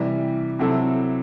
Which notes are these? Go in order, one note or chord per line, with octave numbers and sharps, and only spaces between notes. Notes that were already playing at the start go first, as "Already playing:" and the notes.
Already playing: C3 E3 G3
C3 F#3 C4 E4 A4